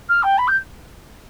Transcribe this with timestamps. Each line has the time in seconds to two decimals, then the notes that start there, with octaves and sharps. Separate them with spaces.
0.09 F6
0.23 G5
0.38 B5
0.47 G6